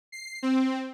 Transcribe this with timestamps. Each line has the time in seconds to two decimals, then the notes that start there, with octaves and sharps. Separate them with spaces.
0.12 C7
0.43 C4